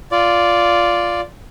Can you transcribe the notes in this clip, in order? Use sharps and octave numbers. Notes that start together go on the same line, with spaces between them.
F4 D5